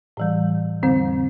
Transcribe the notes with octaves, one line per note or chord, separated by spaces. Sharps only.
A2 E3 G3
F2 D3 G3 C4